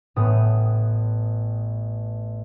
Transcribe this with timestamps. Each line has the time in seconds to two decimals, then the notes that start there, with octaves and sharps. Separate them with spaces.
0.16 A1 A2 B3 D#6